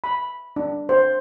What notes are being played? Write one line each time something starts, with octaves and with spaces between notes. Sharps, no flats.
B5
D4
C5